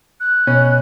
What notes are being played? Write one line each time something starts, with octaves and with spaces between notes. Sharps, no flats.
F#6
B2 C#4